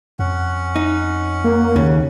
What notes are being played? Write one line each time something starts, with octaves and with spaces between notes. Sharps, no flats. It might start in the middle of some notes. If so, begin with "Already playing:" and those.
F2 C#4 F#5
D#4
A#3
D#2 C#3